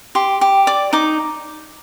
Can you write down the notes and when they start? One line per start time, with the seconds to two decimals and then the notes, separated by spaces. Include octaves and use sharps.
0.15 G4 C6
0.41 G4
0.67 D5 D6
0.93 D#4 D6